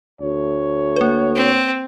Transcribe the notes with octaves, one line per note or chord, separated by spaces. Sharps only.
D2 C#5
A#3 B4
C4